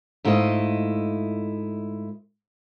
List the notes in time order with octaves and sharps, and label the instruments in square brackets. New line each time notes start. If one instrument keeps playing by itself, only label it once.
[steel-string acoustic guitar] G#2 A3 E4 F4 B4 D#5